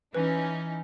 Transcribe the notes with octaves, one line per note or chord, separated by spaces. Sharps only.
E3 C#4 D#4 B4